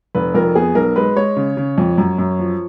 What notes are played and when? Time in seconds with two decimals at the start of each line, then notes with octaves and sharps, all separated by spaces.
0.15 F1 B4
0.34 F2 A#4
0.55 B3 G#4
0.75 B1 A#4
0.96 G#3 B4
1.16 G#3 C#5
1.37 C#3
1.57 C#3
1.78 F2
1.98 F#2
2.18 F#2
2.39 F3